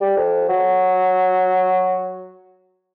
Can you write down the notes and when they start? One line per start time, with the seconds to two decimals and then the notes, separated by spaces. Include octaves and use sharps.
0.01 G3
0.17 F2
0.48 F#3